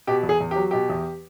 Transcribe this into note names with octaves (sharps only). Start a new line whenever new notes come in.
B2 G4
E2
G#4
E2
F#3 G4
B2 G4
E2